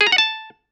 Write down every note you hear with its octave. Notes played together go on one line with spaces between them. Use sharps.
G#4
A#5
F#5
A5